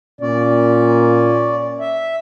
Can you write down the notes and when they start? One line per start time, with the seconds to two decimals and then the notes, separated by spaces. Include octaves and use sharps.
0.21 A#2 C#4 D5
1.80 E5